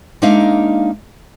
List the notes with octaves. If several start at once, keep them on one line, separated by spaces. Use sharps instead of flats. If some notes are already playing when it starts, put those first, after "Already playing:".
G#3 A#3 D4 D#4 E5 F5